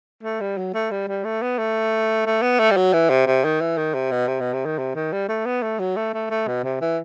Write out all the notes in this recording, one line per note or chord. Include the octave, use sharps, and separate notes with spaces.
A3
G3
F#3
A3
G3
G3
A3
B3
A3
A3
B3
A3
G3
F#3
E3
C3
C3
D#3
E3
D#3
C3
B2
C3
B2
C3
D#3
C3
D#3
G3
A3
B3
A3
F#3
A3
A3
A3
B2
C3
E3